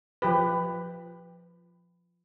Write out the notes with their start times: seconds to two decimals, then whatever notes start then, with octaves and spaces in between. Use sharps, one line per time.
0.22 F3 G4 B4